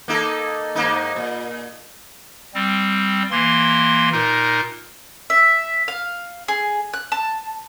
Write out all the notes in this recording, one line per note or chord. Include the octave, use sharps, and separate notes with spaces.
A#3 D#4 A4
G#2 A#3 D#4
A#2
G3 C4
E3 A#3 C6
A#2 D#4 A#4
E5
F5
G#4
F#6
A5